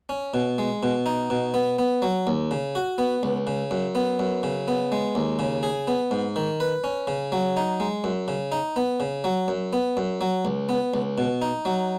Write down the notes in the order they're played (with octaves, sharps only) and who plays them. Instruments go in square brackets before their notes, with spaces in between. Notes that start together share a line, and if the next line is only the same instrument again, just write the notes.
[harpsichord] C#4
B2
G#3
B2
D#4
B2
B3
B3
F#3
D#2
C#3
F#4
B3
C#2
C#3
F#2
B3
F#2
C#3
B3
G#3
D#2
C#3
G#4
B3
G#2
D#3
B4
C#4
C#3
F#3
D#4
G#3
F#2
C#3
D#4
B3
C#3
F#3
F#2
B3
F#2
F#3
C#2
B3
C#2
B2
D#4
F#3